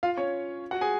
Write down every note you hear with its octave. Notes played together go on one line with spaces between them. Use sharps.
F4 F5
C#4 C#5
F#4 F#5
G#4 G#5